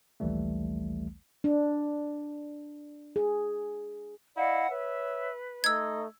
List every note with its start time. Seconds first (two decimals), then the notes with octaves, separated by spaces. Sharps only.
0.20 A#1 D#2 E3 G3 A3
1.44 D4
3.16 G#4
4.37 E4 D5 D#5 F5 F#5
4.70 B4 C#5 E5
5.64 A3 D#4 E6 G#6